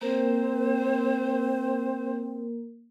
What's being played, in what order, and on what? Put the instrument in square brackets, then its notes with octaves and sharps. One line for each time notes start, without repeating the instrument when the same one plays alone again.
[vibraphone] A#3 A#4 [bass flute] C4 [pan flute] C5